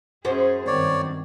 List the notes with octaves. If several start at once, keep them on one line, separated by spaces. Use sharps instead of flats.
F#2 C#4 G#4 C5
G2 D#3 C4 C#5 D5